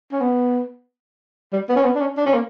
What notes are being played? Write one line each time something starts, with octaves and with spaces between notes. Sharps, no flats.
C#4
B3
G3
B3
C#4
B3
D4
C#4
D4
C#4
A#3